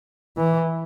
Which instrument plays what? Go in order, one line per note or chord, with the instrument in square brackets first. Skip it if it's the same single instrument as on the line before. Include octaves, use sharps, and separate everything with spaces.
[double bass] E3